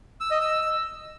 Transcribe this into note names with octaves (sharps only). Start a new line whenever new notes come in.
E6
D#5
E6